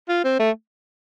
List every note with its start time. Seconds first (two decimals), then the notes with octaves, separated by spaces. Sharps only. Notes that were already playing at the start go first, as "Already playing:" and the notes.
0.09 F4
0.24 C4
0.39 A3